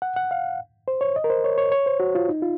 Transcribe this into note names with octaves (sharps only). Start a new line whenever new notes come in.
F#5
F#5
F5
C5
C#5
D#5
A#4
C5
C#5
C#5
C#5
C5
F#4
F4
D#4
F4